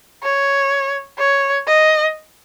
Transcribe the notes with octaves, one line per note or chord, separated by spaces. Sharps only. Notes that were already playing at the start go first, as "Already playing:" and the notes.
C#5
C#5
D#5